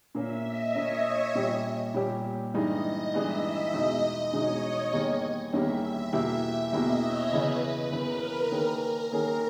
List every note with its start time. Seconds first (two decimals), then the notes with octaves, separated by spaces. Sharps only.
0.15 A#2 A#3 C#4 E5
0.45 D#5
0.75 A#2 A#3 C#4 C#5
1.35 A#2 G3 C#4 G4
1.94 A#2 G3 C#4 G4
2.54 G2 E3 G#3 D#4 D#5
3.14 G2 E3 G#3 D#4 E5
3.74 E2 B2 G#3 D#4 D#5
4.04 D#5
4.33 E2 B2 G#3 D#4 C#5
4.93 E2 D#3 G3 A#3 C#4
5.53 E2 D#3 G3 A#3 C#4 E5
6.13 E2 B2 A#3 E4 G4
6.72 E2 B2 A#3 E4 G4 D#5
7.02 C#5
7.32 E2 C#3 E3 B4
7.62 B4
7.92 E2 C#3 E3 A#4
8.52 D#3 A#3 C#4 G#4
9.11 D#3 A#3 C#4 G#4 A#4